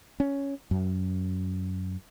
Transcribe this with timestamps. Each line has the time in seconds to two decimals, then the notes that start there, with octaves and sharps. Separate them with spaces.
0.20 C#4
0.71 F#2